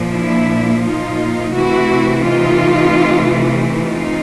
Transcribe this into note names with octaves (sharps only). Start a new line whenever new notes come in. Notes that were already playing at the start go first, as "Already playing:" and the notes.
Already playing: A#2 F3 A#3
D4 E4
D#4 F4
C3 E3 A3 C4 E4 F#4
D#4 F4
D#4 F4